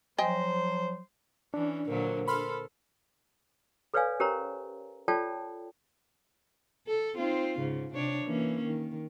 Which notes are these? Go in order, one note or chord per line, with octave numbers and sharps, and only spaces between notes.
F3 F#3 C5 D#5 G5 G#5
E3 C#4 D4
A#2 D3 F#3 A#4 C5
A4 B5 C6 F6
A4 B4 C#5 D5 F5 G#5
C#4 G4 A#4 C5 C#5 A#5
F4 A4 C#5 D5 G5 A5
A4
C4 D#4 F4
G#2 C#3
C3 D4 C#5
E3 A#3 C#4
D#3